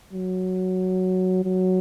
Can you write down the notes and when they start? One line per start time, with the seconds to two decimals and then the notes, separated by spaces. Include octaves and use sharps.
0.13 F#3
1.44 F#3